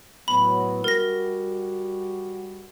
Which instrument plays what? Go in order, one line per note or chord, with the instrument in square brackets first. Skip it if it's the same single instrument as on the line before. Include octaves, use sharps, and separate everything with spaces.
[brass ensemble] A2 F#3 B3 [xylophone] B5
[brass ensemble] G3 F#4 [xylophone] A#4 A#6